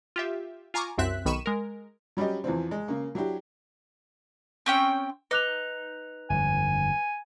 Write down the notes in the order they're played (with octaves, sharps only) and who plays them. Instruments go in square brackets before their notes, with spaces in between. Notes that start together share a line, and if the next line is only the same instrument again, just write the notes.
[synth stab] F4 G4 E5
F4 G#5 A#5 C#6 D6
C2 F#2 C4 E5 F#6 B6
B1 D#3 B5 C#6 D#7 E7
G#3 A#4
[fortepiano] F#3 G3 C#4 G4 D#5
E2 E3 F3 C4
G#3
C#3 A#3
F#3 D4 E4 G4
[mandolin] C4 C#4 G5
[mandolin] D#4 [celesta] B4 F#6 F7
[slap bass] G1 F2 [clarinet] G#5